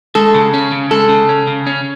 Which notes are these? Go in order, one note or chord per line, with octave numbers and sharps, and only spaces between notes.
G#3 A4
C#3
C#4
C#3
G#3 A4
C#3
C#4
C#3
C#4